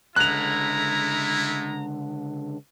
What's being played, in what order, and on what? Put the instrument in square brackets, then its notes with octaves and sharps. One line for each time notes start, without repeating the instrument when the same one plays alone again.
[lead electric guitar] C#2 D3 [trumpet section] G#3 A3 E4 [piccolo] A#5 [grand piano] F#6 F7